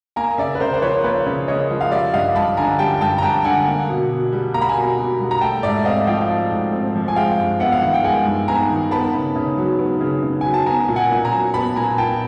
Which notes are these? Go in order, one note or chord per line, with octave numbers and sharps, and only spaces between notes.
A#3 G#5 A#5
C#3 D5 E5
B4
C#3 A#4 C5
C5
F3 B4 C#5
A#3 B4 C#5
C#3
C#3 C#5 D#5
F3
F5
G3 D5 E5
G2 D#5 F5
G2 A5 B5
D3 G#5 A#5
G3 G5 A5
G2 G5 A5
A#5
G2 G5 A5
D3 F#5 G#5
A#3
B2
B2
G3
A#3 A#5
B5
G#5 A#5
B2
B2
G3
A#5
A3 G5 A5
G#2 D5 E5
E5
C4 D#5 F5
F3 F5 G5
A3
G#2
C4
F3
G#5
G#3 F5 G5
G2
B3 E5 F#5
F5
D#3 F#5
G5
G#3 F#5 G#5
G2
B3 G#5 A#5
D#3
B3 A5 B5
C#3
C#3
F#3
B3
C#3
C#3
F#3 G#5
A5
B3 G#5 A#5
A#2
F#5 G#5
A#2
G#5 A#5
F#3
B3 A5 B5
A#2 G#5 A#5
A#2 G5 A5